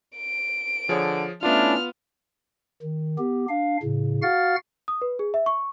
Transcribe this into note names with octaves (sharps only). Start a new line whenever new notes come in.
D7
D3 F3 G#4 C#5
A3 B3 C#4 D4 E4 F4 F6
D#3
B3 G4
D4 F5
A2 C#3
F#4 F5 F#5 F6 A6
D#6
B4
G#4
E5
C#6